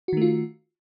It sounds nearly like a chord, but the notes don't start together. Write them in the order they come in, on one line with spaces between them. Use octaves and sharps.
F#4 D#3 A3 F4